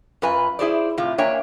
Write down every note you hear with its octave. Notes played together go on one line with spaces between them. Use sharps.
F#2 F4 B4 G#5
E4 G#4 C5 D5
A2 C3 F4
A#3 D4 C#5 E5 G5 G#5